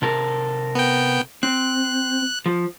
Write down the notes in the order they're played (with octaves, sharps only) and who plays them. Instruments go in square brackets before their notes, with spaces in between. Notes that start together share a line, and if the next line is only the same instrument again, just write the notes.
[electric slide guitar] C3 A4 A#4
[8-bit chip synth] B3 G5
[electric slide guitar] C4 [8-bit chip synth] F#6
[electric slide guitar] F3